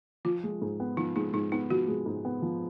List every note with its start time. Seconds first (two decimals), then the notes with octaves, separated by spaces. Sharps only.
0.25 F3 F4
0.44 G#3
0.62 G#2
0.80 B3
0.97 F3 D#4
1.16 G#3 D#4
1.33 G#2 D#4
1.52 B3 D#4
1.70 F3 F#4
1.88 G#3
2.06 G#2
2.25 B3
2.42 F3